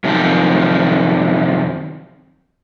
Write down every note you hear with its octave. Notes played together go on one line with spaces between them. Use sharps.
F#2 C3 D#3 F3